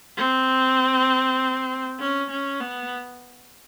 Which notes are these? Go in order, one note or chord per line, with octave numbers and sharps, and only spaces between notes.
C4
C#4
C#4
B3